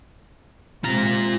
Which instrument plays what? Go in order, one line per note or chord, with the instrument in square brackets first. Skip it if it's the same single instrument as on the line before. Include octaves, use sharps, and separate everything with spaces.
[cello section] C3 G#3 [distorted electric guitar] F4 A#5